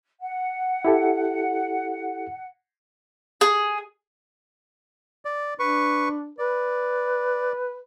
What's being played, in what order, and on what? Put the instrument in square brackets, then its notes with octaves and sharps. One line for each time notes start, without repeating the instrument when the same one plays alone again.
[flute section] F#5
[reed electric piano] E4 G4 A4
[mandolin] G#4
[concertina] D5
[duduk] D4 [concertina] B4 C#6
[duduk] B4 [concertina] D5